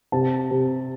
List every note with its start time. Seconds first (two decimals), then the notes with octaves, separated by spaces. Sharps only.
0.12 C3 A5
0.51 C3